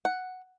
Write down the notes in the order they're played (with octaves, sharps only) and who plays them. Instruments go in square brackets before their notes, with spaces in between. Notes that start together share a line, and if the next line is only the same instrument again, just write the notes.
[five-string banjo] F#5